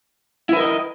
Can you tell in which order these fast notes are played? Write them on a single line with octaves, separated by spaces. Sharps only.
E4 B4 A#4 D#5